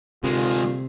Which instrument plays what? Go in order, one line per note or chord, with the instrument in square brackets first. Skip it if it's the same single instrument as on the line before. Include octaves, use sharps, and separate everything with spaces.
[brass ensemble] D2 F4 [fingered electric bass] C3 [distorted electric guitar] D#3 G#3